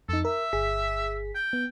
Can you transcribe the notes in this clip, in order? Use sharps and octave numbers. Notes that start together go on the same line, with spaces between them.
F2 D#4 A4
A#4 E5
G1 G#4 B6
G5
B3